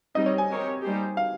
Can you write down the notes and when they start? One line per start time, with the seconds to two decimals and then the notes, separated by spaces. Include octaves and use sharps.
0.15 G3 C4 D#4 D#5
0.26 C#5
0.38 G#5
0.50 C4 G4 A#4 C#5
0.83 G3 A#3 D#4 G4 C5
1.17 F5